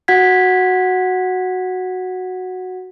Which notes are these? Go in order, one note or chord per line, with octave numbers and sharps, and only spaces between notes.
F#4 F#5 G#6 B6